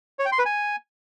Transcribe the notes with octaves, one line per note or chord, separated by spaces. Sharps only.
C#5
G5
C6
B4
G#5